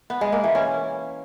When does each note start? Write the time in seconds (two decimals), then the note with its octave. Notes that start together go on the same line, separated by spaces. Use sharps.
0.10 B3
0.21 G#3
0.32 A#3
0.44 E3
0.55 C#4